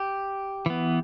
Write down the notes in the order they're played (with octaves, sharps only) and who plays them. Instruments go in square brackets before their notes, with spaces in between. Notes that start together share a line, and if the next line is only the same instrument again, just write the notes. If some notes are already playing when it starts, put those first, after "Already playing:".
Already playing: [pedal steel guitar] G4
E3 B3